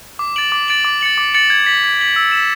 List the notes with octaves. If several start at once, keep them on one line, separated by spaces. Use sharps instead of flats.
D6
A6 D7 F#7
D6
A6 D7 F#7
D6
A6 C#7 F#7
D6
A6 C#7 F#7
G#6
B6 F#7
G#6
B6 F#7
E6
B6 E7